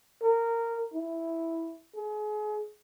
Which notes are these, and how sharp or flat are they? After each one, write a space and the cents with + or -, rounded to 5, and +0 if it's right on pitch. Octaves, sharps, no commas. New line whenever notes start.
A#4 -15
E4 +0
G#4 +35